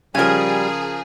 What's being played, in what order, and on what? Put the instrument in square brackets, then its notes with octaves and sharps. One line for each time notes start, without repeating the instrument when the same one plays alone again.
[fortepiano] C#3 F3 [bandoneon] G3 [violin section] G#4 [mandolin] A#4 G#5